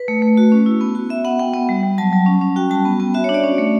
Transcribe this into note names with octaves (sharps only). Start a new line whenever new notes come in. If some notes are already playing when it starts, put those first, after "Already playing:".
Already playing: B4
A3
A3
F#4
C#4
E4
B3
F#4
B3 E5
B3 F#5
B3 G5
B3
G3
G3
F#3 A5
F#3
C#4
C#4
F#4 G5
G3 A5
B3
B3
F#4 E5
C#5
D4
D5
C#4
A3